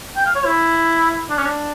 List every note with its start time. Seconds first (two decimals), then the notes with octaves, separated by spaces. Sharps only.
0.16 G5
0.26 F5
0.35 C#5
0.45 E4
1.30 D4
1.38 C#4
1.46 D4